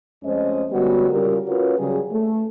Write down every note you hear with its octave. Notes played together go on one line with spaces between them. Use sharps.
F2 G#3 A3 C#4 C5 D#5
D3 G3 G#3 B3 C#4 F#4
C#3 G3 F4 G4 A#4
C#4 F4 F#4 A#4 B4 C#5
C#3 F#3 G3 G#4
A3